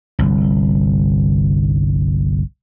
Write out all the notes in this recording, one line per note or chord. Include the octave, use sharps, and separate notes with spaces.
G1 C2